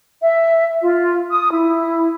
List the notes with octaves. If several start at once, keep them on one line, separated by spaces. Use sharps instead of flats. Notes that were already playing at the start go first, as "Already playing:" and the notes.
E5
F4
D#6
E4